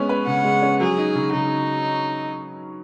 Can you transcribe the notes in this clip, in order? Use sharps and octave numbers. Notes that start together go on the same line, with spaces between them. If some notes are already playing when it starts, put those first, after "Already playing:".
Already playing: G#3 B3 C#4
B4
C#3 F#5
G#3
C#4
F#3 G#4
D#4
C#3
C#3 D#4